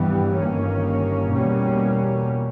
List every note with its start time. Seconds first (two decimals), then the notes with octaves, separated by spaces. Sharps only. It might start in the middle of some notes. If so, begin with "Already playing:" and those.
Already playing: G2 E3 G3 B3
0.35 G1 G2 D#3 A#3 C#4
1.32 E2 B2 G3 A#3 C#4